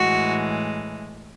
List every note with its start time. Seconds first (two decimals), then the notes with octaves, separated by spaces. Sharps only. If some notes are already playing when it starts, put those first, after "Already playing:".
Already playing: A2 E3 G#3 F#4